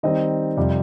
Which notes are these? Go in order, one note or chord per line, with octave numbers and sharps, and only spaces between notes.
D#3 G3 C4 D#4 D#5
F2 C3 G3